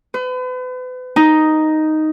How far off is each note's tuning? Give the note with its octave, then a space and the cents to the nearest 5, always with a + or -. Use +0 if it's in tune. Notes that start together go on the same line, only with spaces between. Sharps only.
B4 +40
D#4 +0